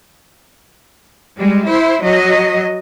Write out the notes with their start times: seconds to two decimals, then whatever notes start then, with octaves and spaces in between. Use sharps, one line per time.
1.36 G3 G#3
1.68 E4 C5
2.02 F#3 D#5